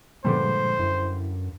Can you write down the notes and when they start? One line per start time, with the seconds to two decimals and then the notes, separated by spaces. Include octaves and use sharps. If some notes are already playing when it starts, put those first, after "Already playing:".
0.25 G2 A#2 D3 F3 G#3 C5 D6
0.79 F#2 E4